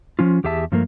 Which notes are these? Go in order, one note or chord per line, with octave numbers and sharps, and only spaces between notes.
F3 C#4 F4
E2 G4 G#4 E5 A5
G2 F3 A3 A#3 A#4